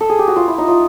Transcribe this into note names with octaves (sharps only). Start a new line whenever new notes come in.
A4
G#4
G4
F#4
F4
E4
D#4
F4